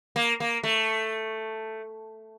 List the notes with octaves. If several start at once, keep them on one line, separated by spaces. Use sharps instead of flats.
A#3
A#3
A3